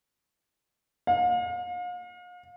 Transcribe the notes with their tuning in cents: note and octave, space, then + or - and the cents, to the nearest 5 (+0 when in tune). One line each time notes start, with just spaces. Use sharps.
F5 +40